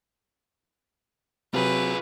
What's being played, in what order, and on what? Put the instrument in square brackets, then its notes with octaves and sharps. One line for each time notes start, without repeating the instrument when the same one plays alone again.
[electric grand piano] C3 F#3 [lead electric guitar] F4 G#4 [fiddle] B4